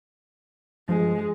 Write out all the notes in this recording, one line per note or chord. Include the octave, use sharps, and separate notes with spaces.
G2 F3 G#3